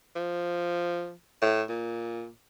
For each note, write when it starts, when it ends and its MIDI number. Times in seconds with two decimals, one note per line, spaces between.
0.16 1.13 53
1.42 1.63 45
1.69 2.29 46